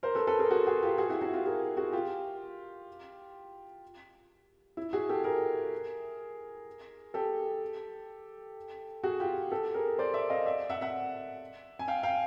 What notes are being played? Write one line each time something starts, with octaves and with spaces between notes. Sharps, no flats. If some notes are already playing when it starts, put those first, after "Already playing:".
A#4 C5
A4 B4
A4 B4
G#4 A#4
F#4 G#4
F#4 G#4
F4 G4
F#4 G#4
E4 F#4
E4 F#4
F4 G4
G#4 A#4
F#4 G#4
F4 G4
E4
F#4 G#4
G4 A4
G#4 A#4
G4 A4
F#4 G#4
F4 G4
G4 A4
G#4 A#4
C5 D5
D5 E5
D#5 F5
D5 E5
E5 F#5
E5 F#5
G#5
F5 G5
F5 G5